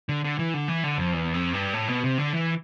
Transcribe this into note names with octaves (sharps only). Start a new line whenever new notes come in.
D3
D3
E3
D3
E3
D3
F2
E2
F2
G2
A2
B2
C3
D3
E3